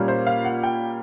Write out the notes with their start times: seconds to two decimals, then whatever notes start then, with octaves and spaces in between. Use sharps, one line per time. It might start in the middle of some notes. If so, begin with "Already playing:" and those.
Already playing: A#2 G3 A#3 C#4
0.08 C5
0.27 F5
0.45 F#5
0.63 G5